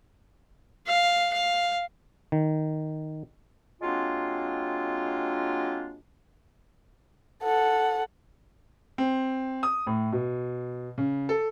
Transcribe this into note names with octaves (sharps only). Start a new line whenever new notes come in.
F5
F5
D#3
F#3 G#3 A#3 C4 D4 F4
A4 F#5
C4
D#6
A2
B2
C#3
A4